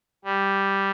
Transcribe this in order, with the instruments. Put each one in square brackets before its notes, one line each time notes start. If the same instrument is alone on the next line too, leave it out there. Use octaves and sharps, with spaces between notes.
[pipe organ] G3